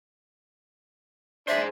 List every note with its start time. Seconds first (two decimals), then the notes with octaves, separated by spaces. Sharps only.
1.48 D4 G#4 C5 E5